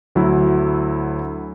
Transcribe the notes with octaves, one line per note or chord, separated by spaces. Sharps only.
D2 F#3 E4